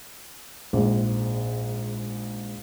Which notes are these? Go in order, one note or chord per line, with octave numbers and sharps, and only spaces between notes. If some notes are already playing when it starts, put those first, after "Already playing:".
A#1 G#2